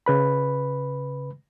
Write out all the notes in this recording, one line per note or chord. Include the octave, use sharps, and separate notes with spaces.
C#3 B4 B5